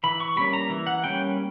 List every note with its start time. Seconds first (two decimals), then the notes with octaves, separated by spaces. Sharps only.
0.04 E3 B5
0.20 C#6
0.36 G3 A#3 C#4 B5
0.53 A#5
0.69 E3
0.87 F#5
1.04 G3 A#3 C#4 G5